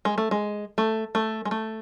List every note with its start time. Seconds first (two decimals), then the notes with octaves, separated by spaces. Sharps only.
0.05 G#3
0.18 A3
0.31 G#3
0.78 A3
1.15 A3
1.45 G#3
1.51 A3